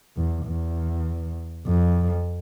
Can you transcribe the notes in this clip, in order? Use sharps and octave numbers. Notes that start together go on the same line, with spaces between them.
E2
E2
F2